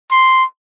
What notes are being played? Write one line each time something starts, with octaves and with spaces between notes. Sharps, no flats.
C6